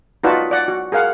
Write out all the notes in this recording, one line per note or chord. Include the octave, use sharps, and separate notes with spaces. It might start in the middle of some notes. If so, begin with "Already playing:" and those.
D#4 F4 F#4 B4 D5 A5
D5 F#5
F#4
G#4 A#4 F5 F#5